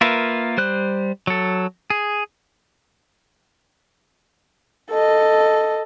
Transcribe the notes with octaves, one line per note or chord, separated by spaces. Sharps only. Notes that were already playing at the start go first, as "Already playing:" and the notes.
A#3 F4 A#4 B4 E5
G3 C5 F#6
F#3 A4
G#4
A4 D#5